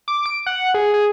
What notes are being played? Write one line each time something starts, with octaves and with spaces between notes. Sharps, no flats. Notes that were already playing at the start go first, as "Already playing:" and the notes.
D6
D7
F#5
G#4
G#4